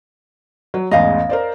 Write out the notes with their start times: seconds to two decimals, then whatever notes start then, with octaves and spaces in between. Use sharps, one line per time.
0.74 F#3
0.91 A1 E2 G#2 D#5 F5
1.29 A#4 C5 D5